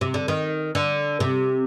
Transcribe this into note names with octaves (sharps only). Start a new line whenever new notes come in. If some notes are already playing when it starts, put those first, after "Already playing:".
C3
D3
D#3
D3
C3